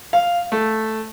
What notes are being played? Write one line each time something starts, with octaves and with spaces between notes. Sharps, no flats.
F5
A3